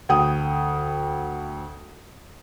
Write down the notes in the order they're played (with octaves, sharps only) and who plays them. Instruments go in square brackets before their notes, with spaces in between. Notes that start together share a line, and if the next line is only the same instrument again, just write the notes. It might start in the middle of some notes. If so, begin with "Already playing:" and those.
[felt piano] D2 G5 D#6